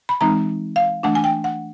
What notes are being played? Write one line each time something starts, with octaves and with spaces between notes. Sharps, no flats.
B5
E3 G#3 C4 D#4 A#5
F5
E3 A3 D4 F#5
G#5
G5
F#5